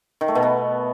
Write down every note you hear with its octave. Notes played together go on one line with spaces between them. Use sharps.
D#3
A3
B2
B3